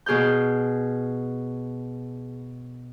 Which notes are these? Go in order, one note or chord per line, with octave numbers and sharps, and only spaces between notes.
B2 G#4 F6 G6